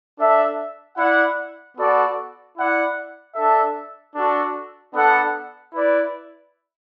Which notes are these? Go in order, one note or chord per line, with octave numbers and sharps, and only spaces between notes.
D4 A4 E5
E4 D5 F#5
B3 F#4 A4 D5 F#5
E4 D5 F#5
D4 A4 E5
D4 F#4 A4
B3 D4 A4 F#5
E4 B4 D5